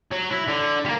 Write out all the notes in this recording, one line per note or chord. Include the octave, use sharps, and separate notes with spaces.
F#3
E4
D3
G3 A#3